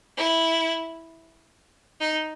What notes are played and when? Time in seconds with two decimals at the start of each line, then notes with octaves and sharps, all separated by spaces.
0.17 E4
2.00 D#4